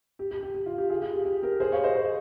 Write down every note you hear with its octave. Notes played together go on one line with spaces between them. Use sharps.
G4
G4
G4
G4
F4
G4
F4 G#4
F4 G#4
G4
G4
G4 A#4
G#4 C5
C#5 F5
C5 D#5
G#4 C5